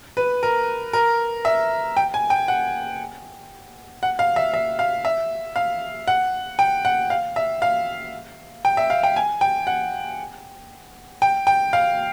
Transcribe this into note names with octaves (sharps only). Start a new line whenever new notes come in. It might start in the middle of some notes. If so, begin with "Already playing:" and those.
B4
A#4
A#4
E5
G5
G#5
G5
F#5
F#5
F5
E5
E5
F5
E5
F5
F#5
G5
F#5
F5
E5
F5
G5
E5
F5
G5
G#5
G5
F#5
G5
G5
F5